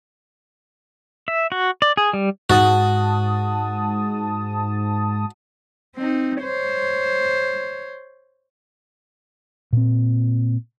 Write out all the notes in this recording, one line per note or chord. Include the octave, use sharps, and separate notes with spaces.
E5
F#4
D5
G#4
G3
G#2 F#4 A5 D#6
C4 D#4
C5 C#5
A#2 C4